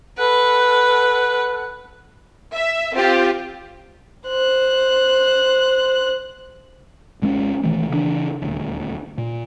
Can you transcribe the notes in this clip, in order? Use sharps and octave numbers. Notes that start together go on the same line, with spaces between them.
A4 B4 F#5 F#6
E5
C4 F4 G4
C5 F#6
G#1 G#3 C4 C#4
B1 D#3 E3 A3
C#3 E3 F#3 D4
D#1 D2
A#2